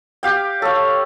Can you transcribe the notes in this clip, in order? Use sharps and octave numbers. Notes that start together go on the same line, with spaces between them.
G4 F5 G5
A4 C#5 F5